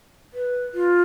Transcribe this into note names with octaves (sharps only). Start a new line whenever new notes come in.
B4
F4